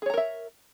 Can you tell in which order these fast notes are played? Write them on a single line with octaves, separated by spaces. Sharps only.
G#4 C#5 A#5 A#4 E5